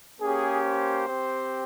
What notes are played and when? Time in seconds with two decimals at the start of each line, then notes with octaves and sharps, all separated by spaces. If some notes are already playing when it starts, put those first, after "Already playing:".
0.21 A#3 C#4 G4 G#4
0.64 C5
1.07 C4 G4